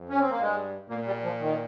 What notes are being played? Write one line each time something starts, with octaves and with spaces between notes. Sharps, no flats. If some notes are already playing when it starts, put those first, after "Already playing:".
Already playing: F2
C#4
C4
A#3
G2 G#3
A#2 A#3
G3
F3
D#3